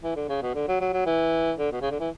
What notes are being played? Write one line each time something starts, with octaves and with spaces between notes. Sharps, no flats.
E3
D3
C#3
B2
D3
F#3
F#3
F#3
E3
D3
B2
C#3
D3
E3